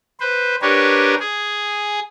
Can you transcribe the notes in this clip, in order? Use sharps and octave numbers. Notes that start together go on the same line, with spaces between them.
B4 C5
D4 G4 A#4 B4 C#5
G#4